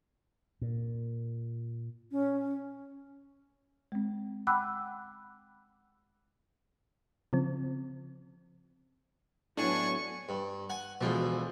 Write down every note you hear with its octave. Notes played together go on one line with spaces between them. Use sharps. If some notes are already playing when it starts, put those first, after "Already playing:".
A#2
C#4
G#3 C4
F#5 G5 B5 D6 E6 F#6
C#3 F3 C4
A2 F#3 B3 D4 G#5 C#6
G2
F#5 G#5
D2 B2 E3 F3 G#3